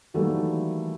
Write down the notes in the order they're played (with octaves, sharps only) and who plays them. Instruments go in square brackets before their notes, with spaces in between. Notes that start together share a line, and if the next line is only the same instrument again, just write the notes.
[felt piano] D#3 E3 F#3 G3 A3 A#3